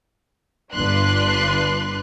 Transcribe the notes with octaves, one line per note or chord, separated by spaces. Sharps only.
G1 G2 D4 B4 C6 F#6